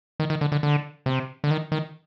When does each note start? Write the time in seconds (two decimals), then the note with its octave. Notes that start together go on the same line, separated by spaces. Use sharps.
0.20 D#3
0.30 D#3
0.41 D3
0.52 D3
0.63 D3
1.06 C3
1.44 D3
1.51 D#3
1.72 D#3